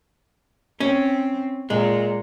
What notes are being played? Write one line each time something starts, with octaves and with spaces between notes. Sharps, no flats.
C4 C#4
A#2 G#3